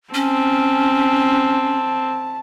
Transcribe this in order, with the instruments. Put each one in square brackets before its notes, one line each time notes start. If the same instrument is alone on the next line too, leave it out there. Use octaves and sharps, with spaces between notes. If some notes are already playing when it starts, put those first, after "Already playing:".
[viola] C4 [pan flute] C#4 [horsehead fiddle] A5